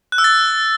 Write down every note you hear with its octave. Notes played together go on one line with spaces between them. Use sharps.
F#6
E6
A6